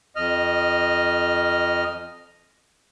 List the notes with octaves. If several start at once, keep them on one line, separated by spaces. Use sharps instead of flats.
F2 D#5 F6